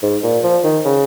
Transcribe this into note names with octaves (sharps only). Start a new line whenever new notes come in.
G#2
A#2
F3
D#3
C#3